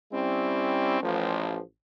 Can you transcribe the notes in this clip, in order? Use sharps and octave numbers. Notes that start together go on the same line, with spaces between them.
G3 C4 C#4 E4
A1 F3